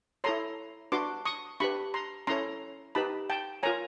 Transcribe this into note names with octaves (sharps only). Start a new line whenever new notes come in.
E4 A4 C#5 A#5 C6
D4 F#4 B4 C6 D6
C#6 D#6
D4 G4 B4 B5 C#6
A#5 C6
C#4 E4 A4 C#5 A#5 C6
D#4 G4 B4 A5 B5
G5 A5
F4 A#4 C#5 G#5 A#5